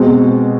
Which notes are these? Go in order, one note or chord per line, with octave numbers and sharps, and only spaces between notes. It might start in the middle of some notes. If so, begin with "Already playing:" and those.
Already playing: B2 G#3 C4